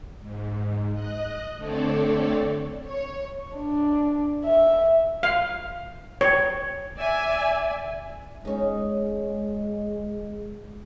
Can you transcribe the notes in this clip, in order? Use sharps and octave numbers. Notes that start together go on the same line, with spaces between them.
G#2
D#5 F#6
D3 A3 C4 A4 C#5 D5
C#5
D4
E5
F5
C#5
D5 E5 G#5
G#3 C#4 D#4